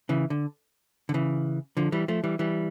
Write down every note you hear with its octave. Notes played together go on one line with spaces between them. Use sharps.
C#3 E3
D3
D3
C#3 E3
D3 F3
E3 G3
F3 A3
E3 G3
E3 G3